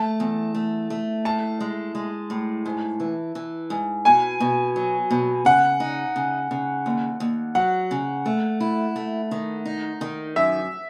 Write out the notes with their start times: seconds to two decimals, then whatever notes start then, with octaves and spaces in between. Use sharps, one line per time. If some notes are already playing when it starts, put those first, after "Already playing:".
Already playing: A3 A5
0.20 E2
0.55 A3
0.90 A3
1.25 A2 A5
1.60 G#3
1.95 G#3
2.30 A2
2.66 G#2
3.00 E3
3.35 E3
3.70 G#2
4.05 B2 G#5
4.40 B2
4.76 F#3
5.11 B2
5.45 C#3 F#5
5.80 D#4
6.16 C#3
6.51 C#3
6.86 D#2
7.20 D#2
7.55 F#3 F#5
7.91 C#3
8.26 A3
8.60 E4
8.96 A3
9.31 D#3
9.65 D#4
10.01 D#3
10.36 F#2 E5